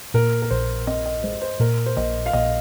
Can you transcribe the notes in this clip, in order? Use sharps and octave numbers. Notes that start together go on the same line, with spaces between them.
A#2 A#4
A#4
A#1 C5
C4 D#5
D#5
G#3 C5
C5
A#2 A#4
C5
A#1 D#5
F5
A#1 D#5